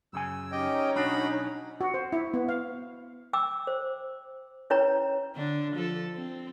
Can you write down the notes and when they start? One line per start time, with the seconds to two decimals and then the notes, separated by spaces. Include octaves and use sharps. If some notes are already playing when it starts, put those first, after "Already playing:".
0.13 F#2 C#3 G#5 E6
0.52 C#4 D#4 G4 D#5 G5
0.95 B1 D4 F#4 A#5 B5
1.81 F#4
1.94 C5
2.12 E4
2.34 B3
2.49 F5
3.33 G5 D6 E6
3.67 C5
4.70 C#4 E4 B4 C#5 G5 A#5
5.36 D3 D4
5.75 F3 A4
6.15 C4